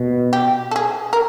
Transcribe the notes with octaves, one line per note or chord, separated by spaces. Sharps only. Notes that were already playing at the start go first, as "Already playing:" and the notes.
Already playing: B2
G4
A4
G#4
A#4